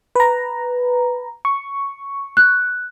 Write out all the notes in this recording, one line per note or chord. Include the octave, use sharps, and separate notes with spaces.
B4 A#5
C#6
F#6